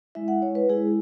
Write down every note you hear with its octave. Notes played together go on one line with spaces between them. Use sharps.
G#3 E4 E5
F#5
C#5
B4
G#3 E4 G#4